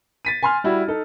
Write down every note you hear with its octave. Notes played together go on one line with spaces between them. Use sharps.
A6 B6 D#7
G#5 C6 F6
G3 E4 F#4
D#4 A4